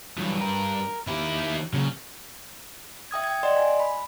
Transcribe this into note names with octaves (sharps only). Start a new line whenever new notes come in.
G2 E3 F#3
A#4
D#3 E4 G4
A#2 C#3 F#3
E5 G5 D#6 G#6
G5 G#6
D5 D#5 F#5 C6
G#5
B5